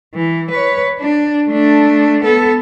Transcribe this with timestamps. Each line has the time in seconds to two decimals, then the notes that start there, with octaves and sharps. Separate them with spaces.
0.14 E3
0.50 B4 C#5
1.00 D4
1.50 A3 D4
2.24 B3 A4